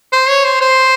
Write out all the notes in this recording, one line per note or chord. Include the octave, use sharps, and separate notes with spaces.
C5
C#5
C5
C5